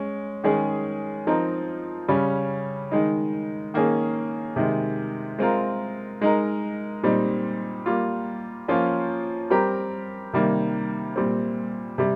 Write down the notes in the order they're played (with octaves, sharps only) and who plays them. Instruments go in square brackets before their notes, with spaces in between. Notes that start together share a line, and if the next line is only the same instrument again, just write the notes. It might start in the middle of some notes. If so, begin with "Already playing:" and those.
Already playing: [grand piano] G#3 C#4
D#3 G#3 C#4 G#4
F3 C4 D#4 A#4
C#3 G3 C#4
D#3 G#3 D#4
D#3 A#3 C#4 G#4
C3 D#3 G#3
G#3 C4 F4 A#4
G#3 D#4 A#4
A#2 G3 C4 D#4
G3 A#3 F4
F3 A#3 C#4 F4
G3 C4 G4 A#4
C3 D#3 G3 A#3
A#2 G3 C4
C3 G3